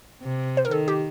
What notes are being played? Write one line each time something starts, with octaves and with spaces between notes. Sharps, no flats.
C3
C5
A#4
D#3 A4
G4